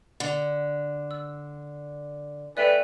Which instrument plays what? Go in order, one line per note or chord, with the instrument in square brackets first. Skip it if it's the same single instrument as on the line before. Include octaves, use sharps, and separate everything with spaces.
[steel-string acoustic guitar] D3
[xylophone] E6
[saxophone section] E3 A3 B4 [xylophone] D5 E5 G5